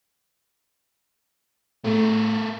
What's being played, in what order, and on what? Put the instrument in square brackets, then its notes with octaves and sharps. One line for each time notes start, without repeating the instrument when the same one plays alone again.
[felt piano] A2 [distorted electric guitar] A3 A#4